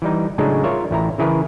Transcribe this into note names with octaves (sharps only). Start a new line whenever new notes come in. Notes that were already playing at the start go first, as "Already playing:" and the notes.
E3 G3 D#4
A2 C#3 F#3 G#3 D4 D#4
F4 A#4 C#5 D5 E5
A1 E4 A#5
C#3 E3 E4 G#4 A#4 B4